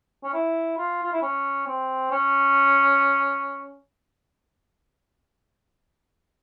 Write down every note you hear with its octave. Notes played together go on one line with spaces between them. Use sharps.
C#4
E4
F4
F4
E4
C#4
C4
C#4